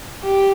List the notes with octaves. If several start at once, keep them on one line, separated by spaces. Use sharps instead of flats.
G4